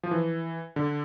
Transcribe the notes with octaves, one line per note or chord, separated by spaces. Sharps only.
F3
E3
D3